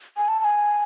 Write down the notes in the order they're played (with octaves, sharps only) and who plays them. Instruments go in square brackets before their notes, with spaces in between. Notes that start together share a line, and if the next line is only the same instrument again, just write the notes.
[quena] G#5
A5
A5
G#5